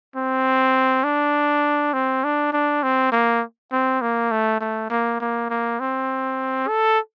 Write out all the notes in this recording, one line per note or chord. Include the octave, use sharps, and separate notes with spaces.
C4
D4
C4
D4
D4
C4
A#3
C4
A#3
A3
A3
A#3
A#3
A#3
C4
A4